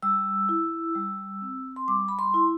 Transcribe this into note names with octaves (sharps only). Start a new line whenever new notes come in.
G3 E6
E4
G3
C4
C6
G3 D6
B5
C6
E4